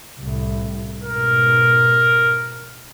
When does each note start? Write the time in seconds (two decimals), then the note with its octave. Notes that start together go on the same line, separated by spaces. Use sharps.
0.19 C2 A2
1.02 G#2 B2 A#4